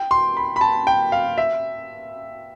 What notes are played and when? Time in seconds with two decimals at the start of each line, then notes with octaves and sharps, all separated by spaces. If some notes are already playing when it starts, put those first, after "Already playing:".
Already playing: G5
0.11 C6
0.37 B5
0.56 B5
0.61 A5
0.87 G5
1.12 F5
1.38 E5